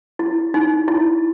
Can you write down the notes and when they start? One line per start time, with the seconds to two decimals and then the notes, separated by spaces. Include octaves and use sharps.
0.19 E4
0.54 D#4
0.88 E4